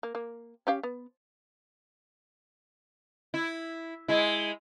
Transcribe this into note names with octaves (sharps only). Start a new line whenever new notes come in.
A#3
A#3
C#4 G4 F5
B3
E4
G#3 E4